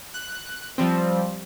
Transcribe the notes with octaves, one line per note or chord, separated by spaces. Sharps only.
F#6
F3 G3 C4